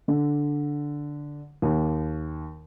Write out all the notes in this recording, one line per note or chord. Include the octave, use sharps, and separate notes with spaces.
D3
D#2